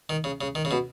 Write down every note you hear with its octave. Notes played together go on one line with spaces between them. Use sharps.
D#3
C#3
C#3
D#3
C#3
B2